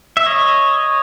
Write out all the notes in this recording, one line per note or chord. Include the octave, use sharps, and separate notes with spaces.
E5
C#5 D#5